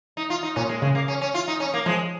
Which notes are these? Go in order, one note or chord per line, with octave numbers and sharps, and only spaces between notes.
D#4
F4
D#4
A#2 C#4
G#3
C#3 G#3
A#3
C#4
C#4
F4
D#4
C#4
A#3
F3 G#3